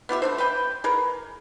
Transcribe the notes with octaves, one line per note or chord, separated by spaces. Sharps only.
B3 F4 G4 E5
A3 D4 C5
B4 F5 G5
G#4 A#4 B4